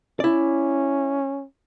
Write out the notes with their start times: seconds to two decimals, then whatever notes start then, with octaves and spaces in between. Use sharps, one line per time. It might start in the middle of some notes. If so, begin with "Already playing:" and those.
0.20 C#4 E4 D5